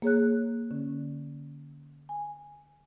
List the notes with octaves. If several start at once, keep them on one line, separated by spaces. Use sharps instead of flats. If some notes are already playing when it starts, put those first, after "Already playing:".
A#3 G#4 C#5 F#6
D3 C#4
G#5